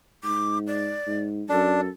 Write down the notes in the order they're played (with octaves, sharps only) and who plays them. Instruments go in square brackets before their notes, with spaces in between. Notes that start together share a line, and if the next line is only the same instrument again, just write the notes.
[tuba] G#2 [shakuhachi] D6
[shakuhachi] D5
[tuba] G#2
[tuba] F#2 [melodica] D4 [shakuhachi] A4